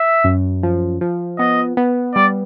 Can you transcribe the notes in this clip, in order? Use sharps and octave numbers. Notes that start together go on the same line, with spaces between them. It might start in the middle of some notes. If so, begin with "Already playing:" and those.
Already playing: E5
F#2
F3
F3
B3 D#5
B3
G3 D5